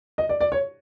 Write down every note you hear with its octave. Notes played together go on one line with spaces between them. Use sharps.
D#5
D5
D5
C#5